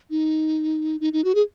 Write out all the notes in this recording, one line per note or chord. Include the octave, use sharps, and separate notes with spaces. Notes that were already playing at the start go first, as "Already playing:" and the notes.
D#4
D#4
D#4
F#4
G#4